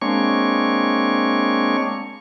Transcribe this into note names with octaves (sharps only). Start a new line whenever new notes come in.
G#3 A#3 C4 D4 C#5 C#6